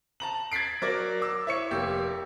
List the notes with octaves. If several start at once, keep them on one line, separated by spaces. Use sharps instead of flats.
A5 A#5 F#7
G#6 A6 B6 C7 D7
F#3 A#4 D5
D6 E6
E4 C#5 C#7
F1 A#3 G4